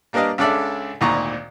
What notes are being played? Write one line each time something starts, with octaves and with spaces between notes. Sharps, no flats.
G3 A#3 D4 B4 D#5 F5
C#2 C#3 D4 A4 D5 E5
G#1 D2 A#2 D#3 A#5 C#6